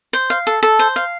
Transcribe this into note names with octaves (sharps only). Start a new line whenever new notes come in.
C5
F5
A4
A4
C5
F5